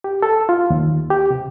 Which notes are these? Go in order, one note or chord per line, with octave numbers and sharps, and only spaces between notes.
G4
A4
F4
D#2
G4
C3